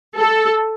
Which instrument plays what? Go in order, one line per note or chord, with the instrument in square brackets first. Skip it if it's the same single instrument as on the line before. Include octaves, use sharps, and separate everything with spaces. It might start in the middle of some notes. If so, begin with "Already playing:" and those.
[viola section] A4